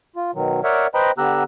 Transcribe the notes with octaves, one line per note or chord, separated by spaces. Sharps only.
F4
B2 D#3 F#3
A#4 C#5 D5 E5 F#5
B4 C5 D#5 G5 A#5 B5
D3 B3 G4 A#5 E6 F#6